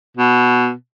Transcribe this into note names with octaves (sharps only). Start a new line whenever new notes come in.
B2